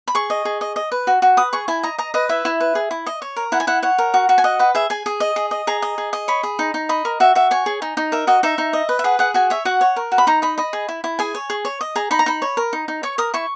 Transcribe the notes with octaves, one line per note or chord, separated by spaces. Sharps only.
B5
G#4 C#6
D#5
G#4
D#5
D#5
B4
F#4
F#4
B4 D#6
G#4 C#6
E4 G#5
D#5 A#5
D#5 A#5
B4 D#5
E4 E5
E4
B4
G#4
E4
D#5
C#5
A#4
E4 F#5
G#5
E4 F#5
C#5 F#5
A#4
F#4
F#4
G#5
D#5 F#5
B4 F#5
G#4 E5
G#4 G#5
G#4
D#5
G#4
D#5
G#4 A#5
D#5
G#4
D#5
C#5 B5
G#4
D#4
D#4
D#5 B5
A#4
F#4 E5
F#4 E5
C#5 G#5
G#4
D#4
D#4
A#4 E5
F#4 D#5
D#4 E5
D#4
D#5
B4
E5
G#4 F#5
G#4 F#5
F#4 G#5
C#5 E5
F#4 F#5
C#5
A#4
F#4
B5
D#4 A#5
D#5 B5
D#5 B5
G#4
E4
E4
G#4 G#5
C#5
G#4
C#5
D#5
G#4 A#5
D#4 B5
A#5
D#4 B5
C#5
A#4
D#4
D#4
C#5 C#6
A#4 D#6
E4 C#6